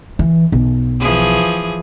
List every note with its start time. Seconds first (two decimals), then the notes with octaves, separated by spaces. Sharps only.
0.19 E3
0.52 B1
1.00 E3 F3 G#4